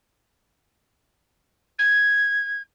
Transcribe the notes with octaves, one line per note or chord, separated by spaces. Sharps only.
G#6